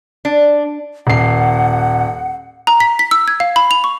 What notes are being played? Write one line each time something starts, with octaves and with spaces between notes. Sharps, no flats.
D4
D#1 F#5 C7
A#5
B6
B6
E6
G#6
F5
B5
F7
C#6